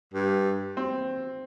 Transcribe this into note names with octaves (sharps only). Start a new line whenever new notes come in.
G2
C4